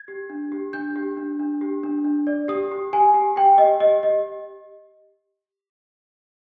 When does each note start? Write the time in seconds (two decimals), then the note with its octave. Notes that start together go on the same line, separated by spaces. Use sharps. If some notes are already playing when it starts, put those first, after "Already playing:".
Already playing: G#6
0.08 G4
0.30 D4
0.52 G4
0.73 D4 G6
0.96 G4
1.17 D4
1.39 D4
1.61 G4
1.83 D4
2.05 D4
2.27 D5
2.48 G4 D#6
2.71 G4
2.93 G4 G#5
3.14 G4
3.36 G4 G5
3.58 G4 D#5
3.80 G4 D#5
4.03 G4 D#5